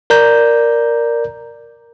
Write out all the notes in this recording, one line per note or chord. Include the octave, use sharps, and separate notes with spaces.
A#4 D5 A#5 G6